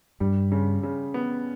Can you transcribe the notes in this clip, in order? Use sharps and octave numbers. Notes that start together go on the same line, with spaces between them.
G2 G3
C#3
C#3
B3